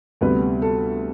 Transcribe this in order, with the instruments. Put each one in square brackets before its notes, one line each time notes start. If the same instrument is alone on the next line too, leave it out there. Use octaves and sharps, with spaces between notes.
[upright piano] D2 C3 G3 B3 B4
A4